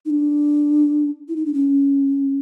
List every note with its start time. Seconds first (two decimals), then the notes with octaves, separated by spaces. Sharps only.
0.05 D#4
0.10 D4
1.29 E4
1.36 D#4
1.46 D4
1.54 C#4